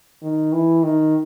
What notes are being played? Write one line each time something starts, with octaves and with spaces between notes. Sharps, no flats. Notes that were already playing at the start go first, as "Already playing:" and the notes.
D#3
E3
D#3